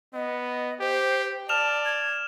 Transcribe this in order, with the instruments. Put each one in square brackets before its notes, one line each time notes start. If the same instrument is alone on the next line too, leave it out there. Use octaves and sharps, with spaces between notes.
[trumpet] B3 [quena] D#5
[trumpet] G4 [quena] C5
[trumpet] D5 [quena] A5 [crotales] F6 E7 F7
[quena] G#6